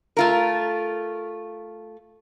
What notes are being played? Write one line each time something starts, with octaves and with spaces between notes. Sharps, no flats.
A3 F4 A#4